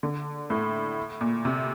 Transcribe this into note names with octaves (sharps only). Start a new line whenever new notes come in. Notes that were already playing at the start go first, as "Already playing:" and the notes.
D3
A2
A#2
C3